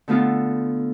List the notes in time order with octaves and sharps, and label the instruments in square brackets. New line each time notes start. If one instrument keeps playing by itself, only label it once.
[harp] D3 A3 B3 F4